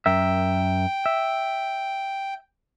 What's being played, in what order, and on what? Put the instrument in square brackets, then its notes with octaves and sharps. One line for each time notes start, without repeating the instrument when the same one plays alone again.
[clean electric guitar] F#2 A#4 E5 [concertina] G5
[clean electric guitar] E5